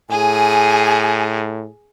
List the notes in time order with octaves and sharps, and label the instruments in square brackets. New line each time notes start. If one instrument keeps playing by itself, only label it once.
[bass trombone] A2 [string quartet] G#4 [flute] G#5